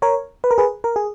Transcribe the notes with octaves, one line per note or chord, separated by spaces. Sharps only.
A#4 C#5
B4
A#4
G#4 B4
A#4
G#4